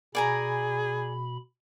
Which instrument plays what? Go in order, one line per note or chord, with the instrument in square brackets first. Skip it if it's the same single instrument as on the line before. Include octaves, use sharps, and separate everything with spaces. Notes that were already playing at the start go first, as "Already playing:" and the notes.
[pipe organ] B2 B5 [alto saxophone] G#4 [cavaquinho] D5 G#5 A#5